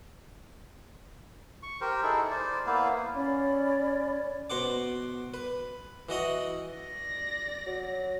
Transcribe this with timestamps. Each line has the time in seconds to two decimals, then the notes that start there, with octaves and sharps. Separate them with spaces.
1.63 C#6
1.81 G4 A#4 C5
2.03 D#4 E4 G#4 A4
2.31 C5 D5
2.67 A#3 B3 E4 F5
3.15 C#4 C#5 D5 B5
4.50 B2 C5 F#5 D6
5.34 B4
6.09 E3 F#4 D#5 F#5
6.71 D5 A#6
7.66 F#3